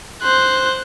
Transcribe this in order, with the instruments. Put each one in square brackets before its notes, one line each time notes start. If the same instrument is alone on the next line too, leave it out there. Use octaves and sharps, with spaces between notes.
[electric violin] C5 F#6